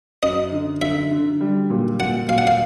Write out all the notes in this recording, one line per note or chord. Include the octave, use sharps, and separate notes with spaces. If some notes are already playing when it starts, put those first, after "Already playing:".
F#2 D#5
D3
D3 E5
D3
G3
A#2
A#2 F#5
A#2 F5
F#5
F5